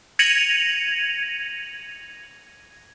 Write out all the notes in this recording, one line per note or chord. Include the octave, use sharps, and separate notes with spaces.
G#6 A#6 C#7 D#7 F7 F#7